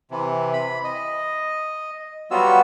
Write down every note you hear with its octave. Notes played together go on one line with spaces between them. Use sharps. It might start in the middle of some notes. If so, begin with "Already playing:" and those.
C3 E3
B5
D#5
F#3 G3 B3 F4 F#4 E6